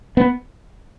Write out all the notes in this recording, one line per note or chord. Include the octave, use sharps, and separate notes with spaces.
B3